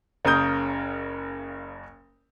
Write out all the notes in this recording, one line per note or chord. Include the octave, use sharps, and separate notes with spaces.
F#1 C#3 A#4 D#6 G6